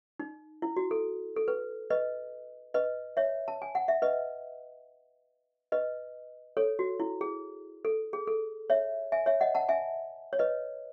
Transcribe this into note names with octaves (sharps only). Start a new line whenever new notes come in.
D#4
E4
F#4
A4
A4
B4
B4 D#5
B4 D#5
C#5 E5
A5
G#5
F#5
E5
B4 D#5
B4 D#5
A4 C#5
F#4
E4
G#4
A4
G#4
A4
C#5 E5
E5 G#5
C#5 E5
D#5 F#5
F#5 A5
E5 G#5
C#5
B4 D#5